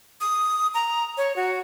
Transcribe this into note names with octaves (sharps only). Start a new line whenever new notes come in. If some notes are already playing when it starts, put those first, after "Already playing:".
D#6
A#5
C#5
F#4